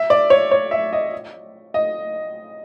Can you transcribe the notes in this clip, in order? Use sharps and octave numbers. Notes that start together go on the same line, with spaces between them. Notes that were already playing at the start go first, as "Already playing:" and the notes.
Already playing: E5
D5
C#5
C#5
E5
D#5
D#5